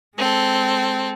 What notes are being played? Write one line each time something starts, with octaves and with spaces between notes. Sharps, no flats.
G#3 C4 A4